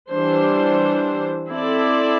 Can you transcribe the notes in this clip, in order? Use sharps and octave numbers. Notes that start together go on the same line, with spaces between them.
E3 G3 D4 C5
C4 E4 A4 D5